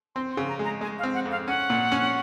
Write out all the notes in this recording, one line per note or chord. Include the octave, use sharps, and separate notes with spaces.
C4 C6
C6
C#3
A#5
G#3
A#5
G#3 G#5
F5
C4
F#5
F2
F5
C#4 F#5
A#2
C#4